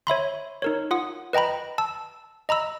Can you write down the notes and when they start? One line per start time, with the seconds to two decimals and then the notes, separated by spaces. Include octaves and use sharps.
0.07 C#5 E5 B5 C6
0.62 D#4 A#4 C#5
0.91 F4 F#5 D#6
1.33 B4 D#5 G5 A#5 B5
1.78 A5 E6
2.49 D#5 A#5 B5 E6